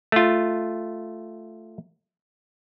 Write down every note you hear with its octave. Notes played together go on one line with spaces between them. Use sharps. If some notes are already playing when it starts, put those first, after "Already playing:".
A3 F4